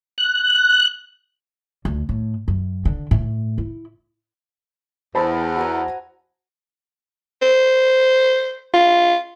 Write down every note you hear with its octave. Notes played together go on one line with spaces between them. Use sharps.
F#6
D2
A2
F#2
D3
A2
E4
E2 C5 A5 B5
F#4 G#5 A#5
C5
F4